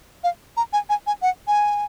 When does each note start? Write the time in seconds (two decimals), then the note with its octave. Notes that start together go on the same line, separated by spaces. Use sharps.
0.24 F5
0.57 A#5
0.73 G#5
0.89 G#5
1.07 G#5
1.22 F#5
1.47 G#5